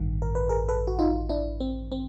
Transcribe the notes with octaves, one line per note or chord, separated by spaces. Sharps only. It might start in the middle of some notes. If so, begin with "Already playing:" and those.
Already playing: A1 G2 D#3
A#4
B4
G#4 A#4
A4 B4
F#4
D#4 F4
D4 E4
C4
C4